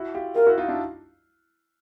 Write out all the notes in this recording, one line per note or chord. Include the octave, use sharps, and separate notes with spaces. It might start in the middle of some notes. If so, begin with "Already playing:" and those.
Already playing: E4 F#4
F4 G4
F4 G4 A#4
E4 F#4
D#4 F4
D4 E4